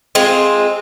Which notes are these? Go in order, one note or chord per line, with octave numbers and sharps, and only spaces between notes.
G#3 C4 F4